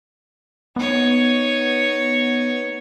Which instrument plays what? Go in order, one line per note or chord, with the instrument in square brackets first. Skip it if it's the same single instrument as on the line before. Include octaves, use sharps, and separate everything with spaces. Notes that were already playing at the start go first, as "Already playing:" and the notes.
[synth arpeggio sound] B3 [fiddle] D#4 C#5